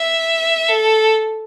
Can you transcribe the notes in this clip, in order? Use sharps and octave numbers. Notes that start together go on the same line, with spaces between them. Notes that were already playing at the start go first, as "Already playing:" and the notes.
Already playing: E5
A4